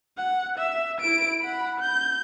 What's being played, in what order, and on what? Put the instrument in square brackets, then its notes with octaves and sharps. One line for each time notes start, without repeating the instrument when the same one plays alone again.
[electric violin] F#5
E5
E4 D7
F#5 B5
G6